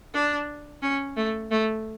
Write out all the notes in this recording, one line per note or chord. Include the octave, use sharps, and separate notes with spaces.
D4
C#4
A3
A3